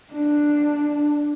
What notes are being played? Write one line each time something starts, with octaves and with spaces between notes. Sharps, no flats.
D4